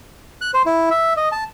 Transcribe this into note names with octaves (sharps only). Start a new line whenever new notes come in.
F#6
C5
E4
E5
D#5
A5